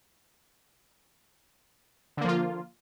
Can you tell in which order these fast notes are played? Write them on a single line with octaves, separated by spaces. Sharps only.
D3 A#3 F3 F4